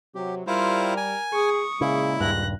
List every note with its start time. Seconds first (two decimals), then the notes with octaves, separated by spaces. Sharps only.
0.15 C3 F#3 G4
0.47 G3 E4 F4 A#4 C5
0.97 G#5
1.33 G#4 C#6 D#6
1.81 A#2 C#3 G#3 E4
2.21 D#1 G2 F#6 A#6